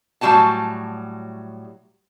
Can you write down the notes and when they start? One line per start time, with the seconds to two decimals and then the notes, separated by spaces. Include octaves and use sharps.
0.21 A2 F#3 G3 F#4 G#5 A5